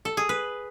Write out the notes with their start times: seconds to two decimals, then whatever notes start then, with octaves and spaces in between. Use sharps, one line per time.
0.05 A4
0.17 G#4
0.29 B4